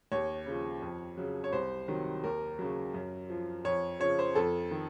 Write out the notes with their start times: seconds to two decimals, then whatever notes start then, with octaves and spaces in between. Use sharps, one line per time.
0.12 D#2 C#5
0.46 C#3 F3
0.82 F2
1.17 C#3 F#3
1.44 C#5
1.53 C2 C5
1.88 C3 D#3 F#3
2.24 D#2 A#4
2.59 C#3 F#3
2.94 F#2
3.30 F3
3.65 F2 C#5
4.00 C#3 F3 C#5
4.19 C5
4.35 F2 A4
4.71 D#3